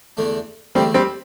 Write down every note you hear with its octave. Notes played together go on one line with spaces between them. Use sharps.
E2 D3 A3 D4
E2 D3 G3 A3 C4 D4
G3 C4